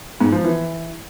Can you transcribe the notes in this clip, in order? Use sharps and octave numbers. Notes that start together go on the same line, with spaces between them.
G#2
F3
E3